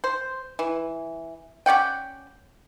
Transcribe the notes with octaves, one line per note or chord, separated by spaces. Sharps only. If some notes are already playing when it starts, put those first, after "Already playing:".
C5
E3
C#4 D5 F#5 G5